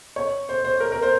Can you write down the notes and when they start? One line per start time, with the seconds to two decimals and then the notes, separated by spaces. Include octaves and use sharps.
0.16 C#5
0.49 C5
0.64 C5
0.80 A#4
0.92 A#4
1.02 C5